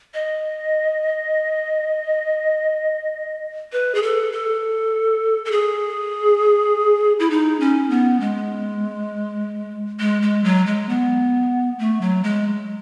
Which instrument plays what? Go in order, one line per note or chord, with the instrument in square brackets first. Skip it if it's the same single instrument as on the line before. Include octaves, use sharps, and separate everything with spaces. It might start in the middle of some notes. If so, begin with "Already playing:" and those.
[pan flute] D#5
B4
G#4
A4
A4
A4
G#4
E4
D#4
C#4
B3
G#3
G#3
G#3
F#3
G#3
B3
A3
F#3
G#3